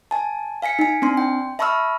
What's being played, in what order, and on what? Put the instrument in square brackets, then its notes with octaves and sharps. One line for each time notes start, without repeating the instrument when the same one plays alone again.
[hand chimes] G#5 A5
F5 G#5 B6 C#7
D#4 G#5
C4 D4 C6
G5
E5 A5 B5 C#6 E6 F6